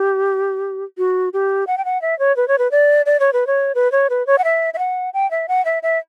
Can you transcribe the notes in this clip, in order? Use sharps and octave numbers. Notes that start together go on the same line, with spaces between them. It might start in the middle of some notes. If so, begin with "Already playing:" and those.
Already playing: G4
F#4
G4
F#5
G5
F#5
E5
C#5
B4
C#5
B4
D5
D5
C#5
B4
C#5
B4
C#5
B4
C#5
F#5
E5
E5
F#5
G5
E5
F#5
E5
E5